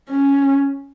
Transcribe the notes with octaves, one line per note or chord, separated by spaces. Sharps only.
C#4